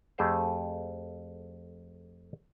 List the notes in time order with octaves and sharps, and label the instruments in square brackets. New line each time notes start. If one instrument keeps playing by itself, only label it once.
[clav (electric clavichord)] F2 A3 G4 G#4 C5 F5